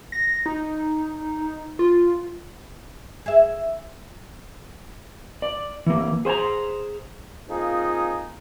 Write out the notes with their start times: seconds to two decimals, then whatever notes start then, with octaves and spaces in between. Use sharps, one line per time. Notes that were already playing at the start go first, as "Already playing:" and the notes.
0.12 A#6
0.46 D#4
1.79 F4
3.26 G#4 E5
5.42 D5
5.86 E3 A#3
6.25 G#4 C5 G5 G#5 A#5
7.49 A#3 C4 D#4 F4 G#4